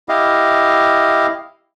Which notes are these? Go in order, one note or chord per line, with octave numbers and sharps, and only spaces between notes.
E4 G4 D#5 F5